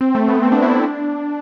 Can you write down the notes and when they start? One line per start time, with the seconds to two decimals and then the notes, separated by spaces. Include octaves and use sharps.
0.01 C4
0.15 A3
0.28 B3
0.43 C4
0.52 D4
0.62 E4
0.73 D4